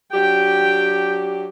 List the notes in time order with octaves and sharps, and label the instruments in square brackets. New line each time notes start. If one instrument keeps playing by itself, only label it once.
[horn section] F#3 D4 G4 [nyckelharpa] G5